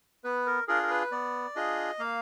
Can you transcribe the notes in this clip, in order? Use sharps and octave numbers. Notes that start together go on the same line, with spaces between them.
B3 B4
A#4
D4 F4 G#4 A#4
A#4
B4
B3 D5
D4 F4 G#4 D#5
A#3 F5